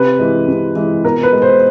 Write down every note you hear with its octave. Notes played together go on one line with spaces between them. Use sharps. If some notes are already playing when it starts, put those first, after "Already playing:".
Already playing: C3 B4
E3 G#3
C3
E3 G#3
B2 A#4
B4
G#3
C5